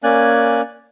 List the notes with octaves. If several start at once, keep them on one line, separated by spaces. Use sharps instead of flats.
A#3 C#4 D5 G#5 F#6